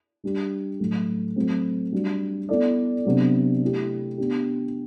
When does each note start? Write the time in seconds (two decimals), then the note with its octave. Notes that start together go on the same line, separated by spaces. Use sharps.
0.24 G3 D4 G4
0.80 A2 F#3 A3
1.36 F#3 A3 C4
1.92 G3 D4 F#4
2.49 B3 E4 A4 D5
3.05 C3 F#3 B3 D4
3.61 A3 E4 G4
4.18 B3 D4 G4